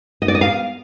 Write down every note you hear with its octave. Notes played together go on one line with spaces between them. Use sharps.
D#5
D5
D#5
F5